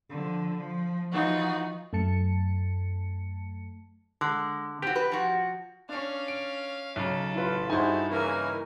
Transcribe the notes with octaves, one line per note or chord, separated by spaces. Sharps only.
D3 F3
F3
E3 F3 D#4 F4 F#4
F#2 A3 A5 C#7
D3 G#3
C4 F#4 G4
B4
F3 F#4
C#4 D4 F5
D7
B1 C#3 A4
A1 E4 F4 B4
G2 D#4 E4 F#4 G#4 C5 G#5
C#3 E3 A#3 E4 A#4 G#5